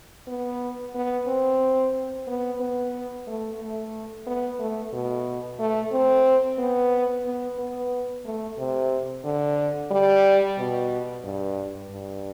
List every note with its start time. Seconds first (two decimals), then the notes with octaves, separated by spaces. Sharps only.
0.28 B3
0.94 B3
1.27 C4
2.27 B3
2.60 B3
3.27 A3
3.60 A3
4.27 B3
4.60 A3
4.93 B2
5.60 A3
5.92 C4
6.59 B3
7.25 B3
7.59 B3
8.25 A3
8.58 C3
9.24 D3
9.91 G3
10.58 B2
11.24 G2
11.91 G2